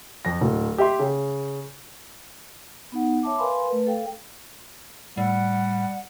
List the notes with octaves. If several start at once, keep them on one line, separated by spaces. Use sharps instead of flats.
F2 A#6
D1
G4 E5 C6
C#3
B3 D#4 F#5
C#5 E5 A5 D6
A#4 B4 F5 G#5 B5 C6
A3 B4
A4 F5 G5
A2 G3 F#5